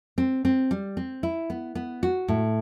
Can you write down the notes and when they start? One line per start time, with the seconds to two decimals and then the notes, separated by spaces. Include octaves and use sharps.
0.18 C4
0.45 C4
0.71 G3
0.97 C4
1.23 E4
1.50 B3
1.75 B3
2.03 F#4
2.28 A2